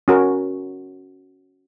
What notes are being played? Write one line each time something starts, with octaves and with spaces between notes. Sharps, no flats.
C#4 F#4 A#4